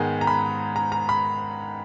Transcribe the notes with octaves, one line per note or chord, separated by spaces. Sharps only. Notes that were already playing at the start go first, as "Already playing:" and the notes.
Already playing: G#2 D#3 G#3 B3 G#5
A#5
B5
A#5
A#5
B5